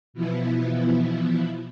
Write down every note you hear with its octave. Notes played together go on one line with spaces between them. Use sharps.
B2 E3 F3 B3 E4